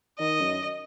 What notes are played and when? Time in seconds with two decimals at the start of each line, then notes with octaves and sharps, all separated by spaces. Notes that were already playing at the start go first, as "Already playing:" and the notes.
0.19 D#3 D#5
0.41 F#2